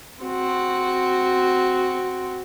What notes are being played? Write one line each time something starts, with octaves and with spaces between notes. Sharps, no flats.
C4 F#4